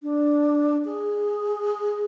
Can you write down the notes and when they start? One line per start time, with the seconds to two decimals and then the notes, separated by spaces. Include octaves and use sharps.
0.03 D4
0.85 G#4